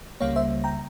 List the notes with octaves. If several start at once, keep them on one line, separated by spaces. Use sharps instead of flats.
C#2 C#3 G3 A#3 C#5 F5
C5 E5
G5 A#5